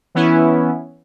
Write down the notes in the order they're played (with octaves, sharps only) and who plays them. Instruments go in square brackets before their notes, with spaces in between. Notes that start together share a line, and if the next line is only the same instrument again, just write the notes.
[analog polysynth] E3 B3 C#4 E4